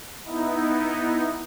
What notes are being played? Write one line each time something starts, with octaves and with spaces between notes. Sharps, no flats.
B3 D#4 E4